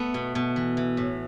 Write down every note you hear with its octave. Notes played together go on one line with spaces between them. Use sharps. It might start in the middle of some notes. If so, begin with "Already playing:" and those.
Already playing: A3 B3
B2
B2
E3
E3
A2